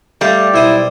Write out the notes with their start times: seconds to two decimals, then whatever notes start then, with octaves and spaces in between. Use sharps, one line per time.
0.21 G3 A3 G4 F5
0.54 B1 E4 C5 D#6